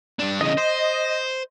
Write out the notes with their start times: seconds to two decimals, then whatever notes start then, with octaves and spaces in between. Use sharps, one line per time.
0.19 G2 D4
0.41 E2 C#3 D#5
0.57 C5